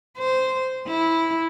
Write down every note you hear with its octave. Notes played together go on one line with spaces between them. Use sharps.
C5
E4